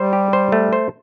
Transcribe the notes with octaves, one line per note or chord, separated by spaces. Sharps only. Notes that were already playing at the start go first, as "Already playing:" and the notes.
Already playing: G3 C5
G4
C5
A3
C5